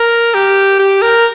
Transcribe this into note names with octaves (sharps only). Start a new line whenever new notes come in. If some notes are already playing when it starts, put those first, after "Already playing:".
Already playing: A#4
G4
G4
A#4